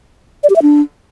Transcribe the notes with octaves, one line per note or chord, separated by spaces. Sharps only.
D5
G4
E5
D4